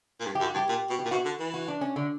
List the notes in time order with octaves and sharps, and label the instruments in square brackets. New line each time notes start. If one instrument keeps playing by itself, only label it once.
[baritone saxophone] A#2
G2
[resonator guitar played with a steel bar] G4
[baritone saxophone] F#2
[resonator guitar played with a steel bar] F#4
[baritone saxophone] G2 [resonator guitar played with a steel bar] G4
[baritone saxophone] A#2
B2
[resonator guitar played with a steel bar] G4
[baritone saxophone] A#2
[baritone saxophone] B2 [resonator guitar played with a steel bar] F#4
[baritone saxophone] D3
E3
[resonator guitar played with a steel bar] F#4
D4
C#4
D3